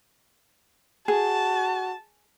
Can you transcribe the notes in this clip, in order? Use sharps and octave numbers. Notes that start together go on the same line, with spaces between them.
F#4 G#4 A5